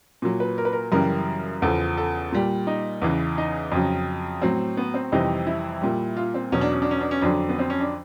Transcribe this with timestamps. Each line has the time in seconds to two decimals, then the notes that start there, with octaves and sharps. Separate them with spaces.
0.22 A#2 F#3
0.40 B4
0.58 A#4
0.65 B4
0.73 A#4
0.92 F#2 C#3 E3 G3 A#4
1.62 E2 C#3 F3 A4
1.97 A4
2.32 A#2 G3
2.67 D#4
3.02 E2 C#3 E3
3.38 D#4
3.72 F2 C#3 F#3
4.42 A2 F#3 C4
4.77 B3
4.94 C4
5.12 F2 C3 E3 G3 D#4
5.47 E4
5.82 A#2 G3
6.17 F4
6.34 C4
6.52 E2 B2 F#3 C#4
6.61 D4
6.72 C#4
6.82 D4
6.91 C#4
7.01 D4
7.11 C#4
7.21 F2 D3 F#3 D4
7.49 B3
7.59 C4
7.70 C#4
7.81 D4